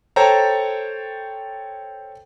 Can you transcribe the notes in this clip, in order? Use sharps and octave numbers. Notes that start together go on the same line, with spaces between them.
A4 C5 C#5 G5 A5 A#5